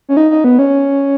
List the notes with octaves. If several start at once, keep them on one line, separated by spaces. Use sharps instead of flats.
C#4
D#4
D#4
B3
C#4